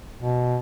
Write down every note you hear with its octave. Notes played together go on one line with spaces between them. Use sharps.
B2